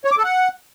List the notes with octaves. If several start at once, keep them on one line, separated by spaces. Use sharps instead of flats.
C#5
D6
A4
F#5